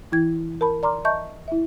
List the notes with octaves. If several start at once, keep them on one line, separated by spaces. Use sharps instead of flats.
E3 E4 G5 G#6
A#4 A5 B5
D5 A#5 C6 D6 F6
D#5 E5 A5 A#5 C#6 G6
E4 E5